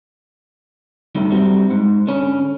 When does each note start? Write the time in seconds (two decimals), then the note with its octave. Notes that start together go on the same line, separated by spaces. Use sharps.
1.15 G2 D#3 F#3 A3
1.30 G2 G3 C4 F#4
1.70 G#2
2.07 D3 C#4